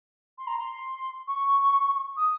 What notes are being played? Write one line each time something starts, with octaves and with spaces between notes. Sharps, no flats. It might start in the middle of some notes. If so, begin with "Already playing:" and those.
C6
A#5
C6
C#6
D#6